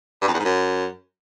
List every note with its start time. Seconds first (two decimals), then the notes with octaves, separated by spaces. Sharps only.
0.22 G2
0.28 F2
0.33 E2
0.39 G#2
0.45 F#2